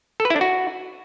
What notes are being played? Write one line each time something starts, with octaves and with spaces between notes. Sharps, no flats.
A4
B4
E4
D4
F#4